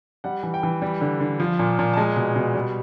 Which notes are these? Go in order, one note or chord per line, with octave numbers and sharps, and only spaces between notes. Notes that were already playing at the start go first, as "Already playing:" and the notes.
G3 F#5
E3
G5
E3
G3
D3
D3
F3
A#2
A#2
A5
G#3 G#5
B2
B2
G3